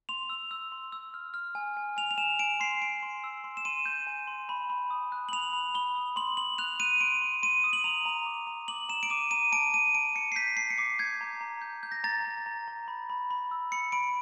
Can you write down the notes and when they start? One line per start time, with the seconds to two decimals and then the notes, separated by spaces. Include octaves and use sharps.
0.09 C6 F7
0.30 E6
0.51 E6
0.72 C6
0.92 E6
1.14 F6
1.34 F6
1.55 G#5
1.77 G#5
1.97 G#5 F7
2.11 F7
2.18 G#5 E7
2.39 G#5 D7
2.60 C6 C7
2.81 G#5 D7
3.03 C6
3.24 E6
3.44 C6
3.57 E7
3.65 C6 D#7
3.86 G6
4.07 G#5
4.27 C6
4.49 B5
4.70 B5
4.90 D#6
5.12 F#6
5.29 F#7
5.32 B5 F7
5.53 B5
5.75 B5 G7
5.95 D#6
6.16 C6 F#7
6.37 C6 F#7
6.58 F#6 F7
6.80 F#6 D#7
7.01 C6 D7
7.22 C6
7.43 C6 D#7
7.64 D#6
7.73 F#7
7.84 A#5 F7
8.06 A#5
8.26 D6
8.47 A#5
8.68 D6 F#7
8.89 A#5 E7
9.03 D7
9.10 D6 D#7
9.31 A#5 D#7
9.52 A5 D7
9.74 A5 D#7
9.94 A5 D7
10.15 A5 C#7
10.32 C7
10.36 G6 B6
10.57 A5 C7
10.70 C#7
10.78 D6 C7
10.99 G6 G#6
11.21 A#5
11.41 A#5
11.62 G6
11.83 G6
11.92 A#6
12.04 A#5 A6
12.24 A#5
12.46 A#5
12.68 A#5
12.88 B5
13.10 B5
13.31 B5
13.51 E6
13.72 B5 C#7
13.92 B5 D7